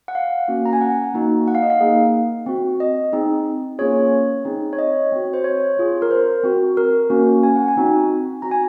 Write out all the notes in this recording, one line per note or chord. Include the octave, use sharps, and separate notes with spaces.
F#5
F5
A#3 C#4 F#4
A#5
G#5
F#5
A#3 D#4 F#4
F#5
F5
D#5
F5
A#3 D#4 G#4
C4 F#4
D#5
C4 D#4 G#4
A#3 C#4 F4 G#4 C#5
C4 D#4 G#4
C#5
D#5
C4 F#4
C5
C#5
C4 F4 G#4
A#4
C5
C4 F#4
A#4
A#3 C#4 F#4
G#5
F#5
G#5
C4 D#4 F#4
C4 F#4 A#5
G#5